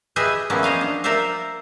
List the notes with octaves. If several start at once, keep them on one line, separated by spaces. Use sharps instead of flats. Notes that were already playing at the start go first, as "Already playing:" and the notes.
G4 G#4 B4 D#5 E5 G#5
F3 G3 A#3 B3 C#4 E4
C5 D#5 F5 G#5
D4
A#4 C5 D5 E5 F5